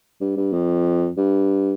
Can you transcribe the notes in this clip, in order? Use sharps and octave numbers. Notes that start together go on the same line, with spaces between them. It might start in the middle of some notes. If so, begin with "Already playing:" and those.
G2
G2
F2
G2